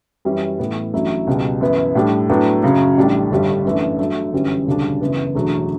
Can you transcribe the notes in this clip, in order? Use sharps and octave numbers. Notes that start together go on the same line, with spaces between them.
F#2 E3 G3 C#4 E4
A2 E3 B3
A1 G2 F#3 A3 E4
C#2 B2 G3
F#2 E3 B3 E4
A2 G3 D4
A2 F#3 B3 D4
F#2 C#3 F#3
A1 A2 G3 D4
G1 G2 D3 G3
F#2 E3 A3 D4
G2 F#3 A3
G1 F#2 E3 G3 C#4
E1 D2 C#3 G3 D4
F#1 F#2 E3 B3
E1 E2 D3 F#3 A3